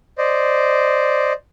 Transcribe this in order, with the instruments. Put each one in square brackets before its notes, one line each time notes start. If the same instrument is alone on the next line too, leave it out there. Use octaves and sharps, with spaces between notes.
[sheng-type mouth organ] C5 D5 D#5